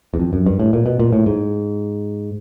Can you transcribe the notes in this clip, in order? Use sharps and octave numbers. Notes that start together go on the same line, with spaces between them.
E2
F2
F#2
G2
A2
A#2
B2
A#2
A2
G#2